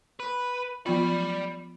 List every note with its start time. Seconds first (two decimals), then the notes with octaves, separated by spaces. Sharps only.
0.20 B4
0.86 F3 B3 F4 D5 B5